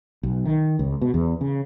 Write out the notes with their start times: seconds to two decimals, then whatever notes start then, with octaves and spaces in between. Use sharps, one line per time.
0.23 B1
0.45 D#3
0.79 C#2
1.01 B2
1.14 E2
1.41 C#3